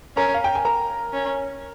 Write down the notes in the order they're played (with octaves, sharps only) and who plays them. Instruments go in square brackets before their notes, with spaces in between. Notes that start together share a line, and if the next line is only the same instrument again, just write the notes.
[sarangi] C#4 [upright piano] A#4 A#5
[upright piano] F5
G5
G#5
A#4 A#5
[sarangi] C#4